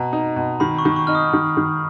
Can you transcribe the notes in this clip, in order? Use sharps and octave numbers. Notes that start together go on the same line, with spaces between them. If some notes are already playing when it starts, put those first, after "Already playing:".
Already playing: B2 A#5
D#4
B2
D#3 B5
C#6
D#3
C#6
D#4 F6
D#6
D#3
D#3